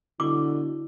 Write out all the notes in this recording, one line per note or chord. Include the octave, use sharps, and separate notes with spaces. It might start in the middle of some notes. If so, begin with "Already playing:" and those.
B2 D3 E4 D6